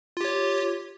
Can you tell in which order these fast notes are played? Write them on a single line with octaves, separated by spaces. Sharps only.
F4 G4 C#5